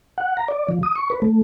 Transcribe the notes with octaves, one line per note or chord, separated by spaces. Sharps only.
F#5
A#5
D5
F3
D#6
C#6
B4
A3